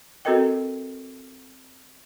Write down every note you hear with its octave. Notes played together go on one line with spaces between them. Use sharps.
C4 F#4 A4 A#4 D#5 G5